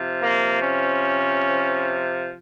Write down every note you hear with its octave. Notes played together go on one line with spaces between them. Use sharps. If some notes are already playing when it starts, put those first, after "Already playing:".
Already playing: C3 F3
A#3
C#4